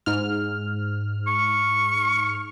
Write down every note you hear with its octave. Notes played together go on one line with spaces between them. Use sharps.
G#2 F6
C#6